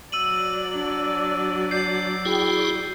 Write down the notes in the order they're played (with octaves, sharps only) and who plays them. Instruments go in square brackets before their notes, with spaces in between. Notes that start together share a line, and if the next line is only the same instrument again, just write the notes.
[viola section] F#3 D5 [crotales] E6 D#7 F#7
[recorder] D4
[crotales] G6 C7
[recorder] E4 [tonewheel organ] F#4 G#4 G5